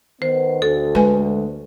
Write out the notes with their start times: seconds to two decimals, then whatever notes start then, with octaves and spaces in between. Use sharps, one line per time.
0.22 D#3 B3 C5
0.62 D2 A4
0.95 G#3 B4 G#5